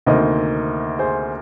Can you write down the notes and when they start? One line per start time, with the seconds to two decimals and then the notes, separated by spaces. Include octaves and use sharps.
0.06 D2 C3 D#3 A#3 C5 D#5
0.99 G#4 C5